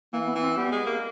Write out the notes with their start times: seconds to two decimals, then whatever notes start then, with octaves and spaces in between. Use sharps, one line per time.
0.13 E3 A#3
0.27 B3
0.35 E3
0.43 C4
0.57 G3 B3
0.72 G#3
0.86 A#3